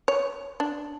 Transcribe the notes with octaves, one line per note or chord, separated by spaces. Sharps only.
C#5
D4